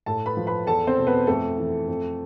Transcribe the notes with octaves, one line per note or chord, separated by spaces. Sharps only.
A2 A4 A5
B4 B5
F3
B4 B5
E2 A4 A5
C4 C5
B2
B3 B4
F2 A3 A4
E3
F2